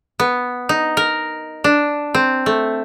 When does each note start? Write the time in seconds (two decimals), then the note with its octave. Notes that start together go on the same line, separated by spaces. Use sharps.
0.20 B3
0.69 D#4
0.97 A#4
1.64 D4
2.15 C4
2.46 A3